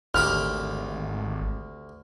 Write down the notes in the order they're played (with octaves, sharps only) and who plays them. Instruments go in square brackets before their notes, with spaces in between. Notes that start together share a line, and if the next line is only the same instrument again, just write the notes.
[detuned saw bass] G#1 [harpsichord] D2 G4 B5 [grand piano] F6